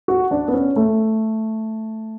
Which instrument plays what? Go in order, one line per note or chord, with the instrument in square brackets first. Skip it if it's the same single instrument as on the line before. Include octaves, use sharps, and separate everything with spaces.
[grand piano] F#4
D4
B3
C#4
A3